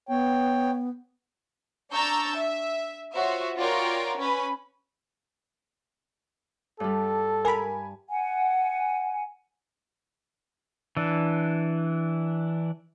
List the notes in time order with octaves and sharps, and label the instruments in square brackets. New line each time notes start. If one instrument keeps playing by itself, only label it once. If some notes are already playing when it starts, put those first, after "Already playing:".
[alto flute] B3 [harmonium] C#5 G5
[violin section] D4 A#5 C#6 E6 G6 A6
E5
F4 F#4 C5 C#5 E5
F4 F#4 A#4 C#5 D5 G5
C#4 B4 B5
[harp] G2 G3 [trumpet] A4
[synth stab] A#4 B5 [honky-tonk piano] G#5
[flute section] F#5 G#5
[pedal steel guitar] E3 D4